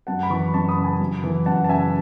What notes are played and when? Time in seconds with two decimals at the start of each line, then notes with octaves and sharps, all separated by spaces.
0.07 F#2 F#5 A5
0.23 B5
0.30 E3 A5 C#6
0.54 F#2 A5 C#6
0.69 B5 D#6
0.77 C#3
0.84 G#5 B5
1.00 F#2
1.24 E3
1.46 F#2 F#5 A5
1.64 A5
1.69 C#3 E5 G#5